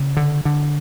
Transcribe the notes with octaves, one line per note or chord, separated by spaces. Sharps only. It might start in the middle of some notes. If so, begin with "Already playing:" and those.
Already playing: C#3
D3
D3